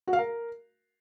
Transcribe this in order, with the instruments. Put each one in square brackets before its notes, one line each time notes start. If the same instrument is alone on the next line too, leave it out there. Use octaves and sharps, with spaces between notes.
[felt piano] F#4
F5
A#4